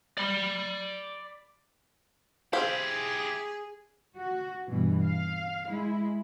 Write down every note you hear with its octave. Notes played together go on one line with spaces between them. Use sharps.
D5 B5
E4 G4 G#4 C5 F5
F#4
G2 B2 E3
F5
G#3 E4